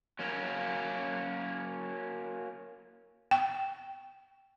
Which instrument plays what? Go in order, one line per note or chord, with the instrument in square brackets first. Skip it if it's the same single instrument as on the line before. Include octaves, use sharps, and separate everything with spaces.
[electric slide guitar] F#3 A#3 C#4
[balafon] G5